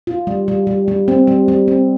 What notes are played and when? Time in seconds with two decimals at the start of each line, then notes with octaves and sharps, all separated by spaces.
0.07 F4
0.27 G3
0.48 G3
0.67 G3
0.88 G3
1.08 C4
1.27 G3
1.48 G3
1.68 C4